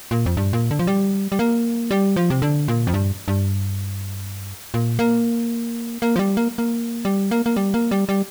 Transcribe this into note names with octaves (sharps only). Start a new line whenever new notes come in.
A#2
F2
G2
A#2
D3
F3
G3
G3
A#3
G3
F3
C3
D3
A#2
F2
G2
G2
A#2
A#3
A#3
F3
G3
A#3
A#3
G3
A#3
A#3
G3
A#3
G3
G3